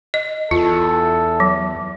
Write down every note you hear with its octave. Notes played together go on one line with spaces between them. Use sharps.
D#5
E2 F4 A4
F#3